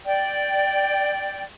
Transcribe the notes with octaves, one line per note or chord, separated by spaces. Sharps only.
D5 G5